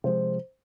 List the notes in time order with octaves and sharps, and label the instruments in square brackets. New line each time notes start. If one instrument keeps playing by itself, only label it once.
[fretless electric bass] C3 F3 G#3 [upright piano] C5